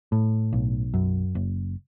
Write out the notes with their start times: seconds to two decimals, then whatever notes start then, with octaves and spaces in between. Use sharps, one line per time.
0.12 A2
0.53 B1
0.94 F#2
1.35 F#1